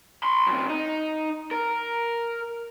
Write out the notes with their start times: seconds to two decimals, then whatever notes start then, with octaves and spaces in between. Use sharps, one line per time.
0.23 B5 C6
0.47 F#2 C3
0.69 D#4
1.51 A#4